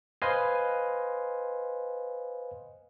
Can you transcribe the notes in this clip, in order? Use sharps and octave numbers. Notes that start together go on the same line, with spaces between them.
B4 C5 D#5 F5 G#5 C6